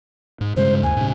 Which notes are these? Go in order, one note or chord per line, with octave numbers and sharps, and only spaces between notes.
G#2
G2 C#3 G#3 C5
D#2 G#5
A2 C#3